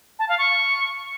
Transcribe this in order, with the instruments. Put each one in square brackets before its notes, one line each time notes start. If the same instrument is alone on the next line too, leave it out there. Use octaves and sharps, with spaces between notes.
[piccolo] A5
F5
C#6